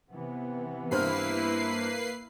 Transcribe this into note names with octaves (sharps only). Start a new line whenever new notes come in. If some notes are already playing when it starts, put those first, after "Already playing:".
C3 E3 B3
G2 A#3 E4 B4 C5 F6 C7